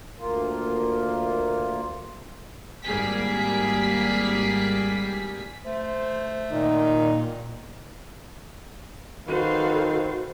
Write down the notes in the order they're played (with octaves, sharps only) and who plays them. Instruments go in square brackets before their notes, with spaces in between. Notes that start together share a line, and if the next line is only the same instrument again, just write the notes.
[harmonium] D2 A#3 F4
[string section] G#1 G3 A#3 G#4 B6
[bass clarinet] A3 [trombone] C5
[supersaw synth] A#2 [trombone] D#3 [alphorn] D#4
[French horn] D#3 [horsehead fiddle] F#4 C5 [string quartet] A4 B4 F5